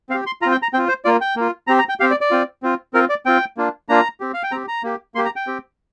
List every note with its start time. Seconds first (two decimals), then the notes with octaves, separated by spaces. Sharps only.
0.10 C4 F5
0.14 G4
0.26 C6
0.42 F4 A#5
0.46 C4
0.52 G5
0.62 A#5
0.73 C4 F4 G5
0.88 C5
1.05 A#3 F4 D5
1.21 G5
1.36 A#3 F4
1.67 C4 G4 A#5
1.79 A#5
1.89 G5
2.00 C4 G4 F5
2.11 D5
2.21 D5
2.31 C4 F4
2.63 C4 F4
2.94 C4 F4 A#4
3.09 D5
3.26 C4 F4 G5
3.57 A#3 D4 F4
3.89 A#3 D4 F4 A#5
4.20 C4 G4
4.34 F5
4.43 G5
4.52 C4 G4 A#5
4.68 A#5
4.83 A#3 G4
5.15 A#3 C6
5.18 G4
5.25 A#5
5.36 G5
5.47 C4 G4